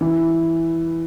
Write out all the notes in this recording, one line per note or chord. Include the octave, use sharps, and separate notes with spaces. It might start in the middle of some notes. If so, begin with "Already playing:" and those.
E3